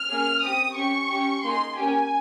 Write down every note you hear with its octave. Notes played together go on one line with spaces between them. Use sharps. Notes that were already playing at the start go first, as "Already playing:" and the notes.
Already playing: F6
A#3 C#4 G#4
C4 G4 D#6
C#4 G4 C#6
C#4 G4
A#3 D#4 G#4 C6
A#3 C#4 G4 G#5